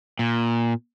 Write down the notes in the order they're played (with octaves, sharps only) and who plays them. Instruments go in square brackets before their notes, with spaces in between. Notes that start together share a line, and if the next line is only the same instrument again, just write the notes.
[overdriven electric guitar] A#2